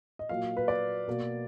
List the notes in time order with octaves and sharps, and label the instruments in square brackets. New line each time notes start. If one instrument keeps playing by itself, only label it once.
[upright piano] D#5
A#2 F#3 A#3 F5
B4
D5
B2 A#3